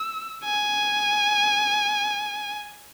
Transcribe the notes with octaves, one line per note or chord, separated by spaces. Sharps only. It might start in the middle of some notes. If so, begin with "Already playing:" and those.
Already playing: E6
G#5